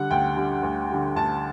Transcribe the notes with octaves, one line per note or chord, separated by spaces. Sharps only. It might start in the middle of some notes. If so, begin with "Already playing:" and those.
Already playing: D3 G3 F#5
D2 G5
D3 G3
D2
D3 G3
D2 A5